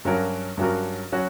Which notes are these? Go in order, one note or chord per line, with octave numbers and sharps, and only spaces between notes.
G2 F#3 C#4 F#4 A#4
G2 F#3 C#4 F#4 A#4
F#3 C#4 F#4